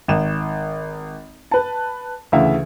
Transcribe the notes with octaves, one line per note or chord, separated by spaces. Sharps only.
G#1 E7
B4 A5
D2 C#3 E3 E5 F5